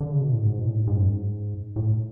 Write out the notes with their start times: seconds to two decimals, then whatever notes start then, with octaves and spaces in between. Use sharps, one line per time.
0.01 D3
0.11 C#3
0.21 B2
0.32 A2
0.43 G#2
0.59 B2
0.65 A2
0.87 G#2
0.96 F#2
1.05 G#2
1.76 A2